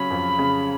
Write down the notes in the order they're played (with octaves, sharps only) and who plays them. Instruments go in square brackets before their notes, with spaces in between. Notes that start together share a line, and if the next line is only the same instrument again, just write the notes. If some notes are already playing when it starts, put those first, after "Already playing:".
Already playing: [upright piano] C#3 F#3 C#4 [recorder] B5
[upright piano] F2
C#3